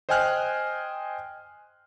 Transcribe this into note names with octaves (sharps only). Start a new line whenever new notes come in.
C5 D#5 G5 G#5 F6 F#6